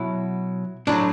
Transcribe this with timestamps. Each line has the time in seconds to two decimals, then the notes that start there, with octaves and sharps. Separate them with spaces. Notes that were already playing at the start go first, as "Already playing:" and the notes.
Already playing: B2 F#3 E4
0.87 A2 F#3 D4